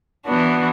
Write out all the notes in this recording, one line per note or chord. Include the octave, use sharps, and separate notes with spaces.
E3 B3 D4 F#4